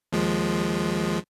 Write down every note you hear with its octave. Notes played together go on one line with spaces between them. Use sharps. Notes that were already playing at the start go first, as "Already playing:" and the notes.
D#2 F3 G#3